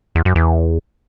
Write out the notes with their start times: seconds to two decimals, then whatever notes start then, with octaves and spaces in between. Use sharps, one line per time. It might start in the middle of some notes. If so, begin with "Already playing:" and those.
0.15 E2
0.25 F#2
0.35 E2